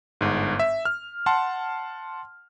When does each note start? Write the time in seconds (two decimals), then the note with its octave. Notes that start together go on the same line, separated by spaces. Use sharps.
0.21 G1 G#2
0.59 E5
0.85 F6
1.26 F#5 A5 C6